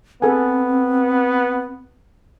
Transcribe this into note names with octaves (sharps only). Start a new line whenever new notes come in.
B3 C4 A4 G#5